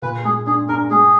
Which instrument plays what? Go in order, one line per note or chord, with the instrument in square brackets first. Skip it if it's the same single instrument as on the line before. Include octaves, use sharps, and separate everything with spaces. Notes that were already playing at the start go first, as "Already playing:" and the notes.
[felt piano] A#2 [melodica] B4
[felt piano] G#3 [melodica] G#4
[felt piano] D4 [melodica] G#4
[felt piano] D4 [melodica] A#4
[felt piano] G#3 [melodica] G#4